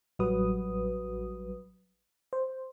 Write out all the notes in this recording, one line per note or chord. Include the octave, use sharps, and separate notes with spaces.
A1 F#3 G3 F#4 B4 D#6
C5